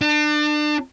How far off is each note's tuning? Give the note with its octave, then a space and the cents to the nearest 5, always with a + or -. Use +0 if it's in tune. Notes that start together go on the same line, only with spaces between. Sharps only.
D4 +35